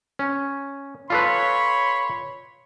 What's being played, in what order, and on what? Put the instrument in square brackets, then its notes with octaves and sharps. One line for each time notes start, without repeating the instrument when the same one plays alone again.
[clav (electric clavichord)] C#4
[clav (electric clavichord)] F4 A4 B4 [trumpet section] C#5 B5 C6